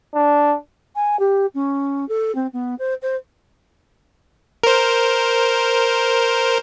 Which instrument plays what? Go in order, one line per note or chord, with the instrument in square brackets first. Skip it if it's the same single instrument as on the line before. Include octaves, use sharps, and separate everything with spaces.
[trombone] D4
[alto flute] G#5
G4
C#4
A4
C4
B3
C5
C5
[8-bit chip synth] A#4 C5